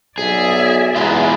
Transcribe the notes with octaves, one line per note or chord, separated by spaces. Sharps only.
B1 G#4 D5 E5
E2 G#3 B3 E4 F4 G#4 F#5 A#5